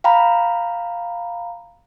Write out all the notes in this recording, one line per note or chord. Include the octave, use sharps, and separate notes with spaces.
F5 G5 A#5 B5